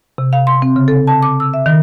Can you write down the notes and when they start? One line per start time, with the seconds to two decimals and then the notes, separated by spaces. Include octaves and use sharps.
0.18 C3
0.33 F5
0.47 C6
0.62 C4
0.76 C#3
0.88 A4
1.07 A5
1.23 D6
1.40 E6
1.54 E5
1.66 D#3